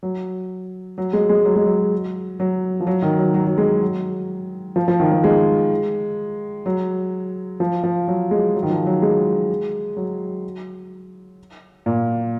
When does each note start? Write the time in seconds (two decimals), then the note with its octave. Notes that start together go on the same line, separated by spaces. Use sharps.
0.03 F#3
0.98 F#3
1.13 G#3
1.29 G#3
1.45 F#3
1.56 G#3
1.66 F#3
2.40 F#3
2.80 F3
2.87 F#3
3.02 D#3
3.19 F#3
3.34 F#3
3.47 F#3
3.58 G#3
3.81 F#3
4.76 F3
4.88 F3
5.00 D#3
5.11 F3
5.24 G#3
6.66 F#3
7.60 F3
7.83 F3
8.08 F#3
8.31 G#3
8.55 F#3
8.63 D#3
8.70 F3
8.86 F#3
9.02 G#3
9.97 F#3
11.86 A#2